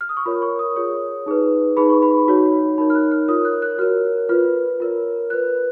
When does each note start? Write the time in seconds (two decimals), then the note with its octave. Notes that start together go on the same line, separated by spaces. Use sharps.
0.01 F6
0.09 D#6
0.17 C#6
0.26 F4 A#4 C#5 B5
0.42 C#6
0.59 D#6
0.76 F4 G#4 C#5
1.26 D#4 G#4 B4
1.77 D#4 G#4 B4 B5
1.90 C#6
2.02 B5
2.27 D#4 F#4 C#5
2.78 D#4 A#4 C#5 B5
2.90 F6
2.95 F#6
3.11 F6
3.28 F4 A#4 C#5 D#6
3.45 F#6
3.62 F#6
3.79 F#4 A#4 C#5 F6
4.29 F4 B4 F6
4.80 F4 A#4 C#5
5.30 F4 B4 F#6